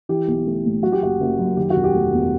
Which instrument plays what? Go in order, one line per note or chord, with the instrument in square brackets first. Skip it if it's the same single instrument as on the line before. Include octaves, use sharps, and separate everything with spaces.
[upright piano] E3 G4
B1
A3
A2
F#3 F#4
G4
F#1 F#4
F#1
F#2
D#3 G4
F#4
E1
G4
A3
E2